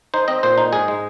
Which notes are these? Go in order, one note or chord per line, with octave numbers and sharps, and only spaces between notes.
D#4 C5
C4 D#5
A#2 C5
D#4
G#2 G#4
G#3